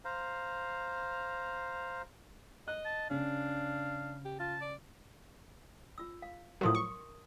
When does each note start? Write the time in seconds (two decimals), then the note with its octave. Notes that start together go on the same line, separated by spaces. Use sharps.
0.05 C5 F5 A#5
2.68 D#5 F#6
2.85 A5
3.10 C#3 D4 F5
4.25 G4
4.40 F4 A5
4.61 D5
5.98 F4 E6
6.22 F5
6.61 A2 F3 F#3 A#4 C6 D#6
6.75 C#6